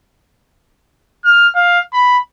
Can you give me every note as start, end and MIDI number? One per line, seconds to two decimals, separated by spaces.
1.25 1.48 89
1.55 1.80 77
1.93 2.18 83